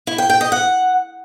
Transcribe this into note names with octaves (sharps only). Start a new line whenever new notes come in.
E4
G5
G5
D#5
F#5